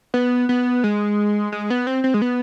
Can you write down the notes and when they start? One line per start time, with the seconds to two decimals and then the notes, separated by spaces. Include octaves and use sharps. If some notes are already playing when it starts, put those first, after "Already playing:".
0.14 B3
0.49 B3
0.84 G#3
1.52 G#3
1.70 B3
1.87 C4
2.04 C4
2.14 G#3
2.22 B3